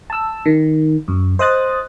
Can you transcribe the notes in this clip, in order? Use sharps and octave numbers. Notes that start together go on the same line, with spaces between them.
A5 E6
D#3
F#2
C5 D#5 D#6 F#6 A6